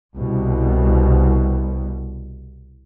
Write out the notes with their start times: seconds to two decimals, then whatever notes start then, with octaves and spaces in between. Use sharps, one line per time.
0.16 C2 B2